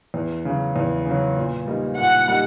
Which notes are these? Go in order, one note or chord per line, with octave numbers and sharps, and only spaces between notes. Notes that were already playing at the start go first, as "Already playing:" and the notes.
E2
C#3 F#3
E2
C#3 F#3
A#2
G3 A#3 D#4
A#2 F#5
G3 A#3 D#4